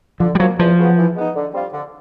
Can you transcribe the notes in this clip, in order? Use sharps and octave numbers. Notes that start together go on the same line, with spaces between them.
D3 F3
G3
F3 F#3 A#3
E2 F3
C#3 F#3 B3
E3
G#3 B3 D#4
D3
G3 C4 F4
D3